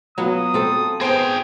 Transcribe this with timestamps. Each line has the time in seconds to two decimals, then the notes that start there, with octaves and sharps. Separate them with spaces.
0.18 F#3 B3 F4 F#4 D#6
0.54 C4 A4
1.01 B3 G#4 C5 G5 C7